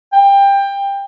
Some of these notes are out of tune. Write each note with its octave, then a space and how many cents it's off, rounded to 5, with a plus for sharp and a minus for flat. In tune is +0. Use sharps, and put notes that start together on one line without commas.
G5 +20